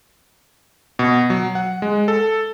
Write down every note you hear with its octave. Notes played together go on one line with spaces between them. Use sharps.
B2
F#3
F#5
G#3
A4